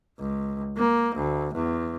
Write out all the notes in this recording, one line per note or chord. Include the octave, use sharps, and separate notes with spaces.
C#2
A#3
D2
E2